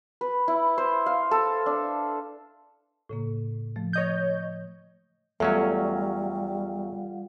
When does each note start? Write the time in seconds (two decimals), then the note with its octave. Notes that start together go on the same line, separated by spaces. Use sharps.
0.21 B4
0.48 E4
0.78 C5
1.06 F5
1.31 A4
1.66 D4
3.09 A2 C#3 A#3
3.76 F3 A3
3.93 C#5 D#5 G6
5.40 E2 F#3 G3 A3 C#4 F4 F5 F#5